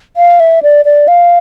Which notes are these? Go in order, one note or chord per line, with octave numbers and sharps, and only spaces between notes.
F5
E5
D5
D5
F5